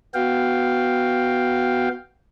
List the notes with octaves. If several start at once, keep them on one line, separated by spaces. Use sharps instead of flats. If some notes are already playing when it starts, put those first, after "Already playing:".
B3 F#4 F5 G5